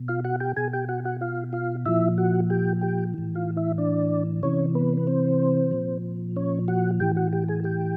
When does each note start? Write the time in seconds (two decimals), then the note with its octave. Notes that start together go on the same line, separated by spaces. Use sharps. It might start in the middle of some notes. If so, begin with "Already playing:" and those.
Already playing: B2
0.08 F4 F5
0.25 F#4 F#5
0.40 G4 G5
0.56 B2 G#4 G#5
0.73 G4 G5
0.89 F#4 F#5
1.05 F#4 F#5
1.21 F4 F5
1.53 F4 F5
1.85 A#2 F3 E4 E5
2.18 F#4 F#5
2.50 G4 G5
2.81 G4 G5
3.14 A2 E3
3.35 F4 F5
3.57 E4 E5
3.78 D4 D5
4.43 C3 E3 C#4 C#5
4.75 B3 B4
4.97 B4
5.07 C4 C5
5.71 A#2 F3
6.36 C#4 C#5
6.68 F#4 F#5
7.00 A2 E3 G4 G5
7.16 F#4 F#5
7.33 G4 G5
7.48 G#4 G#5
7.64 G4 G5